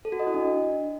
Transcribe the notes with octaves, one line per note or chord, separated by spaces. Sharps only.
A4
F#4
D#5
E4
D4